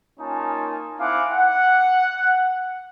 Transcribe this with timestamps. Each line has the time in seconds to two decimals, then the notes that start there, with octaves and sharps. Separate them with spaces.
0.20 A#3 C#4 D#4 F4 G#5 A5
0.99 C4 E4 F5 F#5 G#5 D6
1.32 F#5